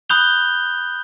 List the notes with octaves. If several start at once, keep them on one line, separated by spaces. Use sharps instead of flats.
B5 D#6 F#6 G6 F7 G7